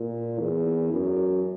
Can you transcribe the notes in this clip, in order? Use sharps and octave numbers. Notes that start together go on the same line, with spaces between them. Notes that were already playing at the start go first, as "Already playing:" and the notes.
Already playing: A#2
E2
F#2